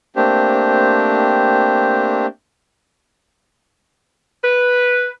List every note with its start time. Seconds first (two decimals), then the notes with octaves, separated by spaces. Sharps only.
0.16 A3 A#3 C4 D4 G4 C5
4.44 B4